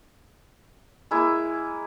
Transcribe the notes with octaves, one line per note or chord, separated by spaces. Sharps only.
G#3 A#3 E4